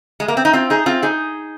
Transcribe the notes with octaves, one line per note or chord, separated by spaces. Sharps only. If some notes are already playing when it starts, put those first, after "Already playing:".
G#3
A#3
C4
D#4
C4 F4
D#4 G#4
C4 F4
D#4 G#4